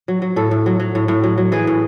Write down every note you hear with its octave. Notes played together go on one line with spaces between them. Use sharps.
F#3
F#3
A2 A4
A2
F#3
F#3
A2
A2
F#3
F#3
E3 G#4
A2